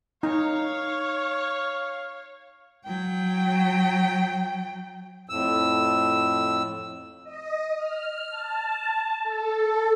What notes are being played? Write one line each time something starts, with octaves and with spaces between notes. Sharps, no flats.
D#4 C#5 F5
F#3 G5
F2 A2 E6
D#5
F6
A5
A4